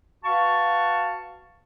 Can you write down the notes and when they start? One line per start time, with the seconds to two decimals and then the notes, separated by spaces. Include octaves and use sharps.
0.24 F#4 B4 F5 A5 C#6